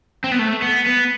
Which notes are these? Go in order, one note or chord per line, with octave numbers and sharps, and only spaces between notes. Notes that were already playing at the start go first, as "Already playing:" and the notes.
C4
B3
A3
B3
B3